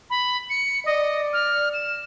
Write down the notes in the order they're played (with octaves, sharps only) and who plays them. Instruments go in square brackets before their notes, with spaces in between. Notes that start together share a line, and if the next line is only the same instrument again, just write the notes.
[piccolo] B5
C#7
[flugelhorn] D5 [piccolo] D#5
[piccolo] F6
E7